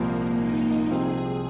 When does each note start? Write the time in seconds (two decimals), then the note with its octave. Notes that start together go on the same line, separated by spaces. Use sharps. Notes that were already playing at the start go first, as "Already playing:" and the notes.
Already playing: C2 A#2 F3 G#3 A#3
0.38 D#4
0.90 C2 C3 F3 C4 F4 G#4